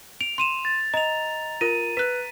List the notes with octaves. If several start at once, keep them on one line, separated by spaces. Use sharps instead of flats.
D7 F7
C6 D#7 E7
A6
D#5 A#5 F7
F4 A#4 D#7
B4 F#6 B6